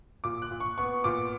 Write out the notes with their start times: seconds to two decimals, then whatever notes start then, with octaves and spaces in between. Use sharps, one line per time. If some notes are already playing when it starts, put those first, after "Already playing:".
0.24 A#2 D6
0.42 F#6
0.51 A#2
0.60 C#6
0.78 B3 C#6
1.04 A#2 D6